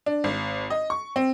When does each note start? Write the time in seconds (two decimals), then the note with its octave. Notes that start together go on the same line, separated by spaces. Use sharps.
0.06 D4
0.24 G#1
0.70 D#5
0.90 C#6
1.16 C4